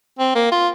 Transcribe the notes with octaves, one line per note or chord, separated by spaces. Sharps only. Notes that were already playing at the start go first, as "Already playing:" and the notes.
C4
A#3
F4